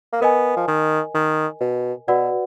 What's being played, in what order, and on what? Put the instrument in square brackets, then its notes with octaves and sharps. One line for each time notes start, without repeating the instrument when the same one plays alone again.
[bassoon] A#3
[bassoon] B3 [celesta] A#4 D#5 G#5
[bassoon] F3
D#3
D#3
B2
[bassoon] B2 [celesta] F#4 B4 D5 F#5